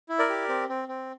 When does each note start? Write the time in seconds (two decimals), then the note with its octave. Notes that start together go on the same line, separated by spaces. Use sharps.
0.09 E4
0.19 A#4 D5
0.29 G4
0.49 C4
0.69 C4
0.88 C4